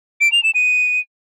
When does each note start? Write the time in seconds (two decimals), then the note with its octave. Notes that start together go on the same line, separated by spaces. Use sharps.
0.21 D7
0.32 F7
0.43 E7
0.55 D#7